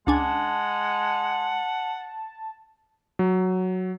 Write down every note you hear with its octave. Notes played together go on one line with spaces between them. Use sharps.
C#2 G#3 D4 F#5 G#5 A5
F#3